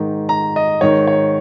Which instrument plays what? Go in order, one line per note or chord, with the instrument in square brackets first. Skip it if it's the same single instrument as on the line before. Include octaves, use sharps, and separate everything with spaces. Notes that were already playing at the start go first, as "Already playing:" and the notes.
Already playing: [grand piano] G#2 D#3
A#5
D#5
G#2 D#3 C#5
C#5